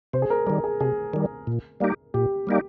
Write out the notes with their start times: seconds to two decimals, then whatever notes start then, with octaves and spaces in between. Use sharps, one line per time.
0.13 C3 C5
0.22 G#4
0.30 A#4
0.46 D#3 G3 A#4
0.64 G#4
0.81 C3 G#4
1.13 D#3 G3
1.47 A#2
1.80 G3 A#3 D#4 G4
2.14 A#2 G4
2.47 G3 A#3 D#4 G4